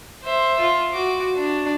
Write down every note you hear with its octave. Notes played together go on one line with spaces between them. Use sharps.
C5 E5
F4
F#4 D6
D4